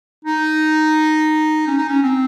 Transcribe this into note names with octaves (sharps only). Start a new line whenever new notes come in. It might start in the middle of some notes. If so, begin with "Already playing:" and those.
D#4
C#4
D#4
C#4
C4